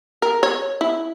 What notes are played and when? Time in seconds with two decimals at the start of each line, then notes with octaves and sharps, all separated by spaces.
0.22 A#4
0.43 C#5
0.81 E4